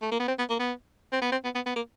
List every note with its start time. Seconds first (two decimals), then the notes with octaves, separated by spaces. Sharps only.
0.02 A3
0.11 A#3
0.20 B3
0.28 C4
0.39 B3
0.50 A#3
0.60 B3
1.12 C4
1.22 B3
1.32 C4
1.44 B3
1.55 B3
1.66 B3
1.76 A#3